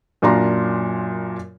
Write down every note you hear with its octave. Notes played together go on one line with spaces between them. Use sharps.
F#2 A#2 D4 F4 A#5 C6